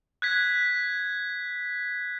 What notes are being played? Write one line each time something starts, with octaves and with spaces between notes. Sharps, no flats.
F#6 G#6 B6